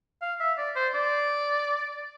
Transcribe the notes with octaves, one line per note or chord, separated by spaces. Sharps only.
F5
E5
D5
C5
D5